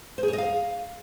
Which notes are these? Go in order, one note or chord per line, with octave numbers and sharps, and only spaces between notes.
C5
G#4
C#5
D#5
F5